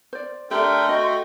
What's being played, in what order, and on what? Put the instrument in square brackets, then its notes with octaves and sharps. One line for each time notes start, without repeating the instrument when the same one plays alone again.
[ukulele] C5 D5
[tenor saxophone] A3 [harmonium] D4 A#4 G5 [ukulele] G4 E5 [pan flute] C6
[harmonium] F#4 G5 [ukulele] D#5